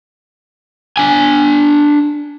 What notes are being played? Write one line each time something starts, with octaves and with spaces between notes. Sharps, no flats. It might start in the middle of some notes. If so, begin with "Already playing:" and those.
D4 G#5